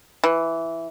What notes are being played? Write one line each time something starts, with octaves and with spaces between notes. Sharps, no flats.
E3